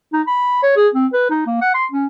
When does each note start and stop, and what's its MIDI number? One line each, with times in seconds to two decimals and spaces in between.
0.13 0.22 63
0.27 0.62 83
0.63 0.74 73
0.76 0.88 68
0.94 1.06 60
1.13 1.29 71
1.30 1.43 63
1.47 1.58 58
1.61 1.71 78
1.75 1.85 84
1.92 2.06 61